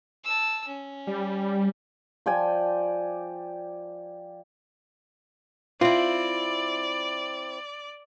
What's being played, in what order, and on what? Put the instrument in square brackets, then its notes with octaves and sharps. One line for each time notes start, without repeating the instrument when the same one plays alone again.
[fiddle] A5 E6
C#4
[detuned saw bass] G3
[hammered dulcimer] F3 D5 G5 G#5
[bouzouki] C4 E4 [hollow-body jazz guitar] F4 [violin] D5